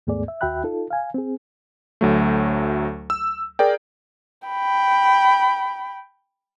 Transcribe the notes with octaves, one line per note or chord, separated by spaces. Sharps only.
D#2 G#2 A3 B3 G#4 D5
E5
D#2 F#4 E5 G5 B5 F#6
D#4 F4 A4
F5 G#5
C4 G#4
D2 F#3 A3
E6
G#4 A#4 D5 G5
G5 B5